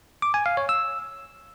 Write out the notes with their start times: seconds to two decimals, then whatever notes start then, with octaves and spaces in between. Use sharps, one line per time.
0.22 D6
0.34 G#5
0.46 F5
0.57 C#5
0.69 E6